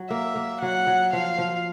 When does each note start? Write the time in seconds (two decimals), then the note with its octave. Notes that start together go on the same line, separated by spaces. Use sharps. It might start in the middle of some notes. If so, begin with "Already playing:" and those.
Already playing: F#3
0.10 A#3 E5
0.36 A#3
0.61 F#3 F#5
0.87 F#3
1.13 F3 F5
1.39 F3